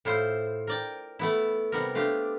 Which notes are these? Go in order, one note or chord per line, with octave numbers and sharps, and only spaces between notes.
A2 E4 F4 C5
A#4 D5 G5
A3 B3 E4
C3 G3 B3 A#4
A3 D4 F4 G4